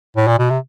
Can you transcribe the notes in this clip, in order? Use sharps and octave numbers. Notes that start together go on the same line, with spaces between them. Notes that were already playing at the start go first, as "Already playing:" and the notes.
A2
A#2
B2
C3